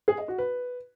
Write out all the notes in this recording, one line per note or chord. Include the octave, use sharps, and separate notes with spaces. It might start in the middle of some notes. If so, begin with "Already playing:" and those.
G#4
D#5
F#4
B4